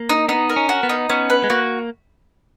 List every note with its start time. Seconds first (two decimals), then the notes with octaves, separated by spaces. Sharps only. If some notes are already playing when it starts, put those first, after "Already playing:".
Already playing: A#3
0.09 D#4
0.29 B3 D#4
0.49 A#4
0.56 C#4
0.69 F#4
0.83 B3
0.89 D#4
1.09 B3 C#4
1.30 B4
1.44 G#3
1.50 A#3 F#4